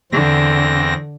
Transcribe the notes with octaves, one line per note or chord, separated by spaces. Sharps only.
E2 D3 C4 A#6